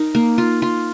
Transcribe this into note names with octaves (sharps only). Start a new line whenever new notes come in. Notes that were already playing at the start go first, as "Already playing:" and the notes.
Already playing: D#4 A#4
A#3
F4
F4